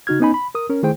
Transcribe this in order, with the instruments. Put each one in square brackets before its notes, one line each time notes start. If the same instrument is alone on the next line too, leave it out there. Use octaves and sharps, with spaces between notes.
[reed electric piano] C#3 D#4 F#4 F6 G#6
B3 C#4 D#4 G#5 B5
B5
A#4 D#6
C#4 A#4
D#3 A3 E4 G#4 C5 G5